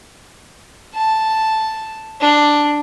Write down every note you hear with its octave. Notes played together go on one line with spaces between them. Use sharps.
A5
D4